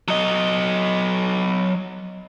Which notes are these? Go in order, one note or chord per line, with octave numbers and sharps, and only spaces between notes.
F#3 D#5